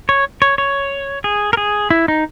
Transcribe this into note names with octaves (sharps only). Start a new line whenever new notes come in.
C#5
C#5
C#5
G#4
A#4
G#4
E4
D#4